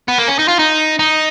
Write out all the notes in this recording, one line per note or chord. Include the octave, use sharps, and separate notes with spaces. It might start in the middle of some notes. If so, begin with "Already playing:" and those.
B3
A#3
C#4
D#4
F4
D#4
D#4